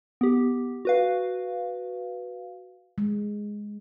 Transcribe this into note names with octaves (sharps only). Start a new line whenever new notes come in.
B3 G4
F#4 B4 F5
G#3